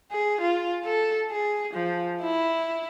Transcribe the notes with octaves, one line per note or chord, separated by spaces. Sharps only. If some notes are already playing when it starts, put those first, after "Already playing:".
G#4
F4
A4
G#4
F3
E4